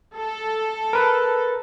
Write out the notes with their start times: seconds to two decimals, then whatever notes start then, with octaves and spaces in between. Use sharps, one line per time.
0.15 A4
0.93 A#4 B4